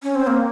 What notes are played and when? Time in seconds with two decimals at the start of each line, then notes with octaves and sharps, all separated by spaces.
0.03 C#4
0.15 C4
0.27 A#3